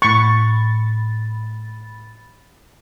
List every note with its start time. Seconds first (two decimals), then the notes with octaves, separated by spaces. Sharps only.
0.02 A2 B5 C#6 A6